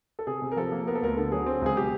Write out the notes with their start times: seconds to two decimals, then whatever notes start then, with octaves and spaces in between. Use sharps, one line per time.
0.19 A4
0.27 C3 G#4
0.42 C3
0.52 A#4
0.56 F3 A4
0.72 A#3
0.87 B3 A#4
0.95 A4
1.02 D2 A#4
1.17 D3 A4
1.32 F#3 G#4
1.46 C4
1.62 C#2 G#4
1.76 B2 G4